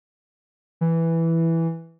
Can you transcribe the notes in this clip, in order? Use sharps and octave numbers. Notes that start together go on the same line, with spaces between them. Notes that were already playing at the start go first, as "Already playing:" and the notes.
E3